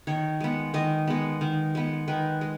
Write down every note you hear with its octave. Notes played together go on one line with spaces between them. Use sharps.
D#3 C#5
G#3 B3
D#3 D#5
G#3 B3
D#3
G#3 B3
D#3 B4
G#3